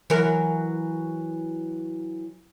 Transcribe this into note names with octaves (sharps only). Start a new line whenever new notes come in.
E3 F#3 A#4